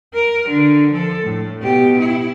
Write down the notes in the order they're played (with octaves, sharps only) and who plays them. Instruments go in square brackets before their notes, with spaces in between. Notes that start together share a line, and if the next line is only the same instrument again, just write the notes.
[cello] A#4
D3
F3 A4
A2
B2 G4
E4